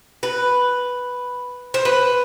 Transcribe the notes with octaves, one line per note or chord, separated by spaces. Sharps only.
B4
C5
B4